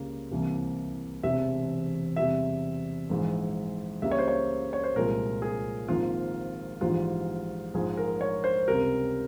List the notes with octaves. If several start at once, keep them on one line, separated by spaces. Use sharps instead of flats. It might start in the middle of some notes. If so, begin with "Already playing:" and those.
Already playing: C#2 C#3 G3 A#3
C2 C3 E3 A#3
E1 E2 C3 E5
E2 C3 G3 E5
A#1 G#2 E3 G#3
C#2 C#3 G3 A#3 E5
C#5
C5
C#5
C#5
C5
C2 A#2 F3 G#3 A#4
G#4
G#1 G#2 F3 A#3 F4
A#1 G#2 E3 G3 F4
A#1 G#2 F3 G#4
A#4
C#5
C5
C#2 C3 G3 A#4